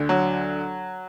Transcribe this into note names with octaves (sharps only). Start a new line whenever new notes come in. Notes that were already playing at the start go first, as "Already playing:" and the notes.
Already playing: D2 D3
F#3